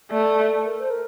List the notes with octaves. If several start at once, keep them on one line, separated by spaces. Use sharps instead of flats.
A3 D5
A#4
C5
A#4